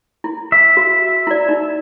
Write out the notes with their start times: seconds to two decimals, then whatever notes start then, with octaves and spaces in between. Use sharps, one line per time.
0.24 E4
0.52 E5
0.77 F#4
1.27 E4 D5
1.49 D#4